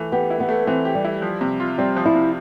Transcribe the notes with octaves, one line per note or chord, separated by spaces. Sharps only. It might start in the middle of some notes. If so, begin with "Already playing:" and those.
Already playing: E3 A3
B3 G4
E4
B3
A3
E3 C4
G4
G3
E4
F3
C3
F4
G3 C4
F3
E4
C3